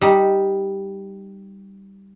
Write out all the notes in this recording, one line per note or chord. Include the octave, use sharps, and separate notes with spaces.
G3 D#4